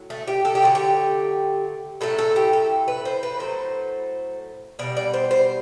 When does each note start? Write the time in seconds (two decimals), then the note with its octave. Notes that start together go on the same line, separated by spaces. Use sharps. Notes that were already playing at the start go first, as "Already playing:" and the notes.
Already playing: A2 F#3
0.10 A3
0.28 G4
0.45 A4
0.55 G4
0.62 D3 F#3 A3 F#4
0.75 G4
2.01 A2 F#3 A3 A4
2.18 A4
2.36 G4
2.53 A4
2.88 B4
3.05 C5
3.23 B4
3.40 A2 F#3 A3 C5
4.79 B2 G3 D5
4.97 D5
5.14 C5
5.31 C5